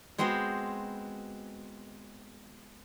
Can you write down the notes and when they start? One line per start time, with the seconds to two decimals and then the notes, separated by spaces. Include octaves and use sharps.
0.18 G#3 B3 C4 F#4 C5